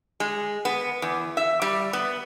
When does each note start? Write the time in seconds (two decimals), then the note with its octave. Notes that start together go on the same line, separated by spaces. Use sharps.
0.20 G#3
0.65 B3
1.02 E2
1.37 E5
1.62 G3
1.93 B3